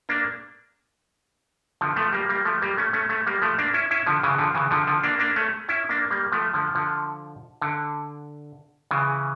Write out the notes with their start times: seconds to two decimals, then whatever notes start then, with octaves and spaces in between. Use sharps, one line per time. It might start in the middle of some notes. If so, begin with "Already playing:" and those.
0.09 A#3 D4
1.81 D3 F3
1.96 F3 A3
2.13 G3 A#3
2.29 G3 A#3
2.45 F3 A3
2.62 G3 A#3
2.77 A3 C#4
2.93 A3 C#4
3.09 A3 C#4
3.26 G3 A#3
3.42 F3 A3
3.58 A#3 D4
3.74 C#4 E4
3.91 C#4 E4
4.06 D3 F3
4.23 C#3 E3
4.38 D3 F3
4.55 C#3 E3
4.71 D3 F3
4.87 D3 F3
5.03 A#3 D4
5.19 A#3 D4
5.36 A3 C#4
5.68 C#4 E4
5.89 A#3 D4
6.11 G3 A#3
6.32 F3 A3
6.54 D3 F3
6.75 D3 F3
7.62 D3
8.91 C#3 E3